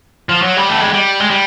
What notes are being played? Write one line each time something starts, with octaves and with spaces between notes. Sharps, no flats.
F3
F#3
G3
A3
G#3
G3
G#3
G3